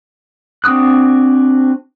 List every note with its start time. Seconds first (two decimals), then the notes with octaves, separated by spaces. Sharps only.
0.64 C4 D4 F#4 D#6 F#6